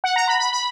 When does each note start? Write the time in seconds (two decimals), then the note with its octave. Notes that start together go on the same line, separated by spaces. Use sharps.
0.04 F#5
0.16 A#5
0.28 B5
0.40 B5
0.53 B5